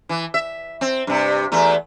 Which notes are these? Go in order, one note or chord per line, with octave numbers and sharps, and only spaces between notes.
E3
E5
C4
G2 C3
E2 A3